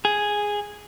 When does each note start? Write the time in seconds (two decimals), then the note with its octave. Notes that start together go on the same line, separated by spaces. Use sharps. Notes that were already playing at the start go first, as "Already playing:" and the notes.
0.05 G#4